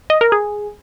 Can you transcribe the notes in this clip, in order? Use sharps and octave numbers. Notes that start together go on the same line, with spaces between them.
D#5
A#4
G#4